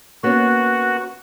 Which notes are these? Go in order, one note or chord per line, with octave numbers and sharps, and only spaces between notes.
A#3 B3 C#4 F#4